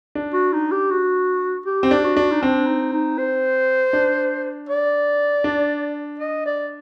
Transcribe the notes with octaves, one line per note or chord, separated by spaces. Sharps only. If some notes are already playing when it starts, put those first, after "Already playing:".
D4
F#4
D#4
G4
F#4
G4
C4
D4
F#4
D4
D#4
C4 D4
D#4
D#4
C5
D4
D5
D4
D#5
D5